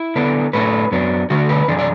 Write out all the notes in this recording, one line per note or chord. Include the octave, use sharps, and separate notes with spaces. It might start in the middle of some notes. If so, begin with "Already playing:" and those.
Already playing: E4
D3 B3 D4
A2 A3 D4 B4
F#2 F#3 B3 D4
D3 A3 D4 F#4
B4
F#2 E3 D4 D5
D5